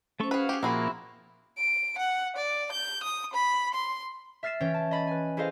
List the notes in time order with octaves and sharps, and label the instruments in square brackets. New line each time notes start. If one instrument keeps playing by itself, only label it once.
[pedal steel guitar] A3 A4 C#6 [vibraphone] C#4 C5
[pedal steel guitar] F#4 F5 [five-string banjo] G#4 B4
[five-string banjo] G4 G#4
[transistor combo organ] A#2 F3 A#3 [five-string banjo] C4 F#4 G#4 [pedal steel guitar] E4 [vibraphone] B5
[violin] D7
F#5
D5
G6
D#6
B5
C6
[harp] E5 F6 A6 C7 E7
E3 C#4 C#5 G5
A5
D#5 B5 A6
B4 G#5
E4 G#4 A4 C5 D#5 F5